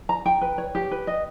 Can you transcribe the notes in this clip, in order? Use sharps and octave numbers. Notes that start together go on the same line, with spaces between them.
A#5
G5
B4
C#5
G4
B4
D#5